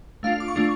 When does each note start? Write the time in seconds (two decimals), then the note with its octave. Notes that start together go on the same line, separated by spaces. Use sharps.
0.23 A3 D4 F4 F5
0.40 D6
0.48 C#6
0.56 A3 D4 F4